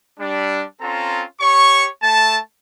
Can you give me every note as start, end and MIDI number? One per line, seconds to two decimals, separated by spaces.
0.19 0.63 55
0.19 0.63 62
0.81 1.23 60
0.81 1.23 61
0.81 1.23 65
0.81 1.23 69
0.81 1.23 82
1.40 1.87 67
1.40 1.87 73
1.40 1.87 85
2.02 2.39 57
2.02 2.39 81